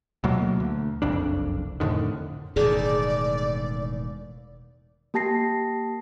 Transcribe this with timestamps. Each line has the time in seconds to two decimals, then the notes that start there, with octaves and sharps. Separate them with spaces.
0.24 D2 B2 F#3 A#3
0.60 D2
1.02 F#1 C2 F2 D4
1.80 F2 A2 D3 D#3
2.56 E1 A2 D#3 G#4 D5
5.14 A#3 G4 A5 A#6 C7